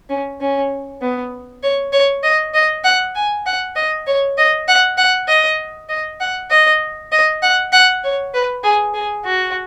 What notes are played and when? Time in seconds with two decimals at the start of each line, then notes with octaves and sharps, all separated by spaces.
0.09 C#4
0.41 C#4
1.01 B3
1.63 C#5
1.93 C#5
2.23 D#5
2.54 D#5
2.84 F#5
3.15 G#5
3.46 F#5
3.75 D#5
4.06 C#5
4.38 D#5
4.68 F#5
4.97 F#5
5.28 D#5
5.89 D#5
6.20 F#5
6.50 D#5
7.12 D#5
7.42 F#5
7.73 F#5
8.04 C#5
8.34 B4
8.63 G#4
8.94 G#4
9.25 F#4